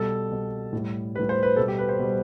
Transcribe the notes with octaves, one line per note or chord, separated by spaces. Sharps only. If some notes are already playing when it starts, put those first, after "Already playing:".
Already playing: B2 G3 A4
B2 G3
A2 G3
A2 G3 B4
C5
B4
B2 G3 A4
G4
B4
C5
B2 G3